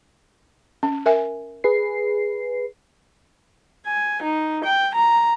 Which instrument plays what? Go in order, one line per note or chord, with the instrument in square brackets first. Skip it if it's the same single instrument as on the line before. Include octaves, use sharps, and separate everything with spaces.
[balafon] C#4
A#4 E5 G#5
[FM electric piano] G#4 B4 C7
[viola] G#5
D#4
G5
A#5